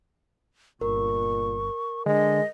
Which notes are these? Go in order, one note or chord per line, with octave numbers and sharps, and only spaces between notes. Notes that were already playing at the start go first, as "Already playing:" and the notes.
G1 A#2 A#4 C#6
D3 G#3 D#5